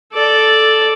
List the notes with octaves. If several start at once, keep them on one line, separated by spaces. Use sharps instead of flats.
A4 D5